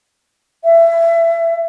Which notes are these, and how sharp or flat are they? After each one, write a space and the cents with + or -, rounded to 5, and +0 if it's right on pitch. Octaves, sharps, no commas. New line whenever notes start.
E5 +25